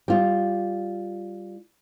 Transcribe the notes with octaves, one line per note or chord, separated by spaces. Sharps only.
G3 F4